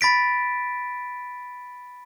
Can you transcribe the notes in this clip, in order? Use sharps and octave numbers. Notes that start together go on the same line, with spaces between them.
B5 A6 B6 D7